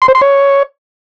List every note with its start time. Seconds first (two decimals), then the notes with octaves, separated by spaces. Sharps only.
0.02 C6
0.08 C5
0.15 C6
0.21 C#5